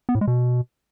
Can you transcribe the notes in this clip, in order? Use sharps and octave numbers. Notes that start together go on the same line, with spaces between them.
B3
A2
G#3
B2